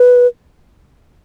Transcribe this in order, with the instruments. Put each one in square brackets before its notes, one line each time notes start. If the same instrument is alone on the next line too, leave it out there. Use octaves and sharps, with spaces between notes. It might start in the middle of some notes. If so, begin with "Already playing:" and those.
Already playing: [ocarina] B4